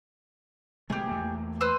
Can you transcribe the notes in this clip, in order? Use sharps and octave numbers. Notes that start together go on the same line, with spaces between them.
B2 G#3 A3 G4 G#4
E2 A3 A#3
B4 C5 E6